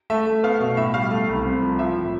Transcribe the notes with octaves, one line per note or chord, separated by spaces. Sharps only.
A3 E5
A3
B3 F5
B2
A2 E5
G3 F5
A3
C2
C4
F3
F3 E5
A2